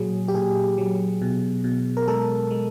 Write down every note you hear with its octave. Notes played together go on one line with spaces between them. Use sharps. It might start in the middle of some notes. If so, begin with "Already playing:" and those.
Already playing: A#2 F#3 G#4
G4
A#2 G#4
F#3
B2
B2
A#4
G#3 A4
G#3